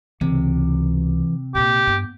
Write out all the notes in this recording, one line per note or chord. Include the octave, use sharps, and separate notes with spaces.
C#2 C3 E3
A#1 A#2 G4
G2 B3